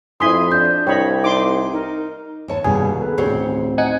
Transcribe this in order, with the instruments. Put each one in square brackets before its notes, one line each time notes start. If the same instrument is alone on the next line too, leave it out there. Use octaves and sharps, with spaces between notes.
[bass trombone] F2 [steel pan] E4 G#5 C6 [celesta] D#6 B6
[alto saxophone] D4 [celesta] G6
[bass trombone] C2 [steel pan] C#5 D#5 B5 [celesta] G5
[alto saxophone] D#4 [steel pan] C6 D6
[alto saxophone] D#4 [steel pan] A#4
[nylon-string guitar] D#2 C#5 A5
[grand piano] C2 G2 B3 [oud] B2 [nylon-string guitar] D#3 A#3 [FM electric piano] G#4
[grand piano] B3 A4 B4
[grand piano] A1 D2 C7 [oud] C4 G4 C#5
[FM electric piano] D#4 F#5 G#5